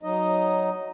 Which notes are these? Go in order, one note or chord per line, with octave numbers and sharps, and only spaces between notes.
F#3 D#4 D#5